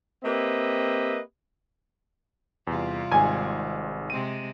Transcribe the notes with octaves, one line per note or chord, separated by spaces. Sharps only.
A#3 C4 G4 B4 D#5 E5
E2 C3 G3 F4
G#1 G#2 G#5
C3 G#3 C4 D#7